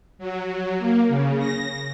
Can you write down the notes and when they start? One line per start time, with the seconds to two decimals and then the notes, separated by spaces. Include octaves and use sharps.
0.19 F#3
0.78 A#3
1.08 C#3
1.39 A#6